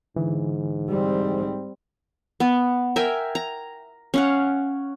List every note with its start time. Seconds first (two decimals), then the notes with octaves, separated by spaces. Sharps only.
0.16 G#2 D3 E3
0.89 G3 C4
2.40 B3
2.96 A#4 E5 G5 G#5
3.35 A#5
4.14 C#4 F5 F#5